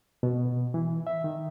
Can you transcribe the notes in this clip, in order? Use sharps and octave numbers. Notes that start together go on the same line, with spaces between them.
B2
E3
E5
D#3